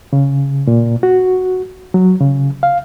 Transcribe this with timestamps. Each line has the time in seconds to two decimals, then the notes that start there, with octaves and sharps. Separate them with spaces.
0.13 C#3
0.67 A#2
1.03 F#4
1.94 F#3
2.20 C#3
2.63 F5